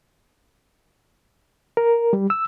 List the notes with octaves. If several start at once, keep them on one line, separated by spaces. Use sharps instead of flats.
A#4
G3
E6